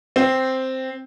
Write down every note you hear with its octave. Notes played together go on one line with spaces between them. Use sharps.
C4